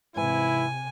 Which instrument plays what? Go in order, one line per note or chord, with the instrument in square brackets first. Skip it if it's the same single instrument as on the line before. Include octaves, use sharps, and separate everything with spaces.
[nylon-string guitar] G#2 E3 [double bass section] C3 [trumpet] E4 [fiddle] G#5